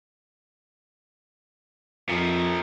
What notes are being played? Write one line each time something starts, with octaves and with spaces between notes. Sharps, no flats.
F2 A#2 F3